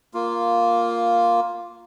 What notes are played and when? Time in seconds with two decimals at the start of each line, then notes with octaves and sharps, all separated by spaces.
0.14 A#3 F4